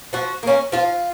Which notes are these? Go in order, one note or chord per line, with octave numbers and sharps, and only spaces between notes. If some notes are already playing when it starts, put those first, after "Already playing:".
F3 F#4
A#3 C#4
F3 F4